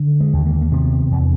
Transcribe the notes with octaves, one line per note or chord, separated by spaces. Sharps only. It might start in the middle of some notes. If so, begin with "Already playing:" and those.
Already playing: D3
G#3
D#2
A#3
A#3
C3 B3
E2